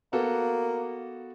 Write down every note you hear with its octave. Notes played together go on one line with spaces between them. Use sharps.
A#3 B3 F#4 A4